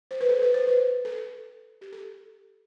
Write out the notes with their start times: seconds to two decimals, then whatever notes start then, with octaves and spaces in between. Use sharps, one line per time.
0.11 C5
0.21 B4
0.29 A4
0.42 B4
0.54 C5
0.67 B4
1.05 A4
1.81 G4
1.92 A4